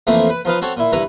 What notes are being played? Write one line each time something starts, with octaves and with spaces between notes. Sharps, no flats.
F2 E3 A3 A#3 C4
B4
F3 D#4 B4 F5
C4 F#4 A4 C#5
A#2 E4
G2 E4 B4 A#5 B5